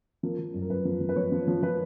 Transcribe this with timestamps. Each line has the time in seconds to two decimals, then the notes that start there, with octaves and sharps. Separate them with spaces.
0.23 F3 A#4
0.39 F3
0.54 F#2
0.62 A#4
0.70 F#2 B4
0.85 F3
1.01 F3
1.09 B4
1.16 F3 C#5
1.32 F3
1.48 F3
1.62 F3 B4